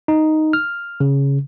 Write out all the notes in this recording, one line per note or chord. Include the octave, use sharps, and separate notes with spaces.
D#4
F6
C#3